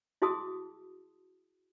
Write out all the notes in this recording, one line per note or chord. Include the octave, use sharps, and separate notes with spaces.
E4 F#4 G#4 A5 D#6 E6